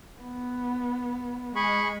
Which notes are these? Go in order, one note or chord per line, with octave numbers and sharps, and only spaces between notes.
B3
G#3 G#4 B5 C#6